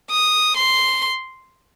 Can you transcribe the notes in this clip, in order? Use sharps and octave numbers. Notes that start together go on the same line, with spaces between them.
D#6
C6